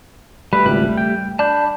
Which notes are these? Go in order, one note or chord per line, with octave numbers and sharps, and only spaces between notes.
G3 A3 G4 B4
G#1 C#2 F#6
G5
D4 A5 B5 G6